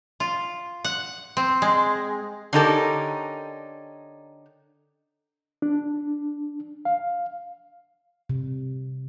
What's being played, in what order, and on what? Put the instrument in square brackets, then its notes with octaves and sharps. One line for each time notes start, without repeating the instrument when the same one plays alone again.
[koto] F4
F#5
C4
G#3
[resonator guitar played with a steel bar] D3 C#4 D#4 G4 A4 A#4
[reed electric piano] D4
F5
[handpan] C3